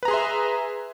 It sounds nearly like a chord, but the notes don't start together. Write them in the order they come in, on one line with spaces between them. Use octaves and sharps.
B4 A#5 G#4 C6 E5